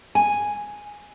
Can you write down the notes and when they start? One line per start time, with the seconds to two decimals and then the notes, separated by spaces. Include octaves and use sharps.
0.15 G#5